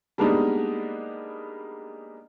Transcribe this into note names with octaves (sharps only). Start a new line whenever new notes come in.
G3 G#3 A#3 B3 D4 D#4